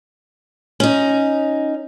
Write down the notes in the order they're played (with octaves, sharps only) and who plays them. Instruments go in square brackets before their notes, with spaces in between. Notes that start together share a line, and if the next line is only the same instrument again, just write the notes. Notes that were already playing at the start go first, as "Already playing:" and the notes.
[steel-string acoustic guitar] C#4 D#4